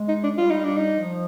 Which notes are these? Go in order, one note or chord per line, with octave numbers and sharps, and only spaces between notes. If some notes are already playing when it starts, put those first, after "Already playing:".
Already playing: G#3
D#4
D4
G3 F4
D#4
D4
D#4
F3